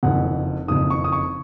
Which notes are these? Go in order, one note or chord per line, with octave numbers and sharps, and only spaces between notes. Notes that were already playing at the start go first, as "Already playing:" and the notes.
F#1 F2 D#3 F#5
F#1 F2 D#3 D#6
C#6
D#6
C#6